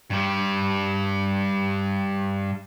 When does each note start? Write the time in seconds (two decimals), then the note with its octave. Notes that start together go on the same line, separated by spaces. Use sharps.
0.10 G2 G3